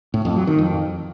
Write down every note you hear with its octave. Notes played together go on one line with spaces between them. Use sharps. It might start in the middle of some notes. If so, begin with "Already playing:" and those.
A2
F2
F#3
D#3
F2